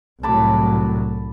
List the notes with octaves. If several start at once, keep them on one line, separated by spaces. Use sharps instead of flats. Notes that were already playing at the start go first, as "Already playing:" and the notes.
C2 A2 F#3 A5 B5 D6